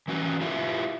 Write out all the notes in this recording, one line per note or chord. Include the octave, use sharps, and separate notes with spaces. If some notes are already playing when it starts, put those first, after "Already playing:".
E3 C#4 F#4 B4
E4 F4 G4 B4 E5 F5